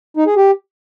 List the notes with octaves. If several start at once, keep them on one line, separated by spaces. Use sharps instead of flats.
D#4
G#4
G4